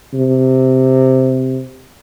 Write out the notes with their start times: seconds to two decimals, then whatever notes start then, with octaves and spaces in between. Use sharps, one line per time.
0.14 C3